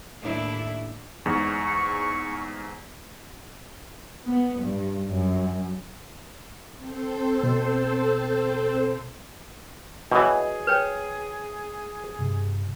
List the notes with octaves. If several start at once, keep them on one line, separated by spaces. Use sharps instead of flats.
D#2 A2 D4 E4
E2 G#2 C#6
B3
G2
F#2
C4 A4 C5
B2
B2 E3 D4 G#4 C#5
B4 C#5 G5
G2 C3